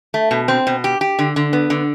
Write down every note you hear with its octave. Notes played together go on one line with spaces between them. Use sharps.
A3
B2
C4
B2
G4
G4
D3
D3
B3
D3